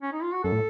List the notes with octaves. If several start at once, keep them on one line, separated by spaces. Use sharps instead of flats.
C#4
D#4
F4
F#4
F#2 A4
A2